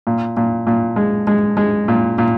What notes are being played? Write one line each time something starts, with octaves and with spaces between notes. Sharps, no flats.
A#2
A#2
A#2
G#3
G#3
G#3
A#2
A#2